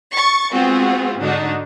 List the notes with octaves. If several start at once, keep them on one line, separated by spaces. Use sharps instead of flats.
C#6 A6
G#3 B3 C4 F4 F#4 G#4
G#2 D3 D4 D#4 F#4